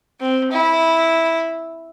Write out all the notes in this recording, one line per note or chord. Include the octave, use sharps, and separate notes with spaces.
C4
E4